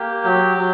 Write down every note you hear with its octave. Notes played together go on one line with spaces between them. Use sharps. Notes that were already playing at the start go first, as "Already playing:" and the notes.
Already playing: A#3 G4
F#3
F#3